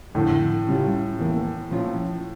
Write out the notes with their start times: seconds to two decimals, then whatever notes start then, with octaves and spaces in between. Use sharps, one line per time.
0.15 F2 A2 D3 A3
0.66 C#3 G3 C#4 F4
1.19 E2 E3 A#3
1.71 A#2 F3 C#4 F4